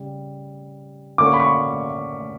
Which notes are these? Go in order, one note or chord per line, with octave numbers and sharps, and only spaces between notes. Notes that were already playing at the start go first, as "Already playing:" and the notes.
Already playing: C#3 G3
D3 A#3 C#4 D6
C#6
B5
C#6